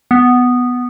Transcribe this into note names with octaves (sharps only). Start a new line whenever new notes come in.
B3